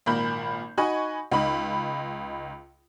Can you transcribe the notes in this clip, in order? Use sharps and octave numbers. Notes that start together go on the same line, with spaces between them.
G#1 A#2 A#4 B5 G6
D#4 F#4 D#5 G#5 B5 C#6
C#2 D#4 B5